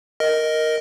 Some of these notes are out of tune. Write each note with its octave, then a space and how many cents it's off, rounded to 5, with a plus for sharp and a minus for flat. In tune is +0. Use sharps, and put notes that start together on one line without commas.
A#4 +0 D#5 +5